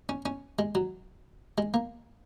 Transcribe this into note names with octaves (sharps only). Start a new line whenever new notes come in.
C#4
C#4
G#3
F#3
G#3
A#3